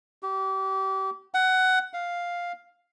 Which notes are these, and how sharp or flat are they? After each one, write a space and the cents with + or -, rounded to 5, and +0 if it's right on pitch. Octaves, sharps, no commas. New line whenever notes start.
G4 -30
F#5 +15
F5 +5